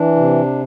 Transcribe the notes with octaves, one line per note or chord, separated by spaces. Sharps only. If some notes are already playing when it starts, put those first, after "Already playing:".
Already playing: E3 D4
C3